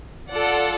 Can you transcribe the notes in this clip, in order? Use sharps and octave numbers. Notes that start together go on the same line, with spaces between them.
F4 A4 D5 F#5